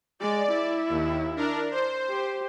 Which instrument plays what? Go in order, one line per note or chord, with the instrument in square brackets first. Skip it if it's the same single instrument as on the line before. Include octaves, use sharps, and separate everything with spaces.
[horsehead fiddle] G#3 [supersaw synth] D5
[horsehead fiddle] E4
[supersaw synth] D#2
D4 A#4
C5
[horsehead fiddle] G4